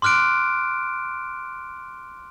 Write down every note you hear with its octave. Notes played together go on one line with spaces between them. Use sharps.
C6 D6 F6 F#6 D7